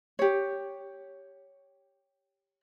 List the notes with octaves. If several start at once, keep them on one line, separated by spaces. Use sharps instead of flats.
G4 C#5